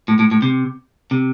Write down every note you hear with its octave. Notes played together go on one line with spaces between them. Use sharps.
A2
A2
A2
C3
C3